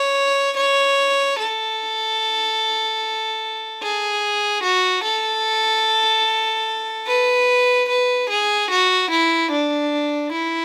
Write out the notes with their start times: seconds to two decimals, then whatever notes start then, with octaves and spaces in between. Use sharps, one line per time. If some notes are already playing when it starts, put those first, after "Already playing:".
Already playing: C#5
0.57 C#5
1.39 A4
3.83 G#4
4.64 F#4
5.04 A4
7.07 B4
7.89 B4
8.30 G#4
8.71 F#4
9.11 E4
9.51 D4
10.33 E4